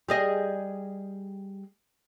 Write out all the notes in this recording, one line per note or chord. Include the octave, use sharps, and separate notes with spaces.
G3 G#4 D#5